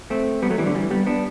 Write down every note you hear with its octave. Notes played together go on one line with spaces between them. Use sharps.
A3 C4
G3 B3
F#3 A3
E3 G3
D3 F#3
E3 G3
G3 B3
B3 D4